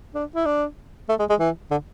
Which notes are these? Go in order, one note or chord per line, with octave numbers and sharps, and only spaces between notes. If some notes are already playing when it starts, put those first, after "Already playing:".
D4
E4
D4
A3
G#3
G#3
E3
D3